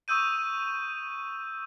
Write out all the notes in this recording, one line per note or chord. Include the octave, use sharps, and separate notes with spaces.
C#6 D#6 E6 G6 D#7